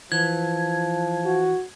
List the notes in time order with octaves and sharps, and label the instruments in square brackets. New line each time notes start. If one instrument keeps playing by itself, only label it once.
[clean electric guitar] E3 [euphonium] F3 [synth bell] G#6
[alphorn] F#4